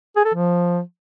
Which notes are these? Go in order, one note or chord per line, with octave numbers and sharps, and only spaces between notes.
G#4
A4
F3